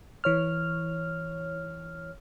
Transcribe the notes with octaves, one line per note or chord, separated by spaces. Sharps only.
E3 C#5 F6